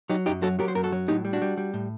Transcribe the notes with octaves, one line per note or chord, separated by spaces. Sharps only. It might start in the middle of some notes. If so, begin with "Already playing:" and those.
F#3 D#4 G4
F#2 D#4 G4
F#3 F#4 A4
F#3 G4 A#4
C5
F#2 A#4
F#4 A4
F#3
A2 D#4 G4
G3
D4 F#4
G3
G3
A2